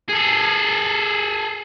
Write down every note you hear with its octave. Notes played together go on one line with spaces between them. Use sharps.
G#4 A4